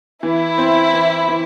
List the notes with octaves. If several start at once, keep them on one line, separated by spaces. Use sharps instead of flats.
E3 E4
C4
E3
E3